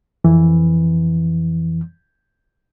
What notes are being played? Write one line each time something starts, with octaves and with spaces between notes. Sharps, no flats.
F2 E3